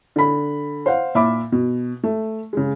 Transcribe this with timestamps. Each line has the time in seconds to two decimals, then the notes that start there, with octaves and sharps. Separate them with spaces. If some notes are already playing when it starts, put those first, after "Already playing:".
0.16 D3 B5
0.86 C5 F5 F#5
1.15 A#2 E5 B5 D6
1.52 B2
2.04 A3
2.53 C#3 G#3